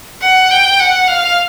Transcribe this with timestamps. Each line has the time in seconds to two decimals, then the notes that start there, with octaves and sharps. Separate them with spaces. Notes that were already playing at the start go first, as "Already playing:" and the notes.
0.22 F#5
0.51 G5
0.80 F#5
1.08 F5